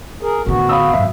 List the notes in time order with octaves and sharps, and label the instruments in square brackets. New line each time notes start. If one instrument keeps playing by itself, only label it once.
[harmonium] G#4 A#4
[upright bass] A2 D3 [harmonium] B3 F#4
[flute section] F5 [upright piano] B5 D#6 E6
[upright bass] G#1 F#2 [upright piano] E5